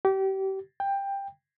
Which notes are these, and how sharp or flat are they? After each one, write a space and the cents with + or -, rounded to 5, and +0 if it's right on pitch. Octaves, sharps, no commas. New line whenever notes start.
G4 -30
G5 +15